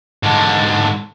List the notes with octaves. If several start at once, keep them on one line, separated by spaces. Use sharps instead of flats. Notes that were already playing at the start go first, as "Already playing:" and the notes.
G#2 D3